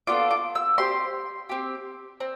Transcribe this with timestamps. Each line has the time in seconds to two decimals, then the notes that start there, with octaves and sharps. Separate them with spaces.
0.07 B3 D4 F4 A4 D6
0.31 D6
0.55 E6
0.78 C4 G4 C6
1.49 C4 G4
2.20 C4